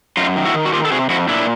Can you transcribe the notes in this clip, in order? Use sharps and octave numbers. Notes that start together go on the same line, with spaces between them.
F#2 D#4 F4
D#3
E4 F#4
D#3
F#4
D#3 F4 G4
A4
C3 F#4 G#4
F2 E4 F#4
A#2 D4 E4